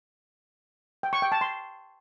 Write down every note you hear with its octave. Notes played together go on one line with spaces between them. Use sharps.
G5
C#6
G5
A5
C6